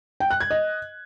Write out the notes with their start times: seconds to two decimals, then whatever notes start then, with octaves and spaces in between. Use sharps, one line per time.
0.20 G5
0.30 F#6
0.40 G#6
0.50 D#5